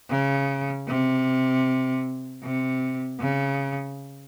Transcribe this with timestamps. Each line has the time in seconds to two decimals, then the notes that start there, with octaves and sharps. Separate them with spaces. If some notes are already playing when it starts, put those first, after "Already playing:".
0.10 C#3
0.88 C3
2.43 C3
3.20 C#3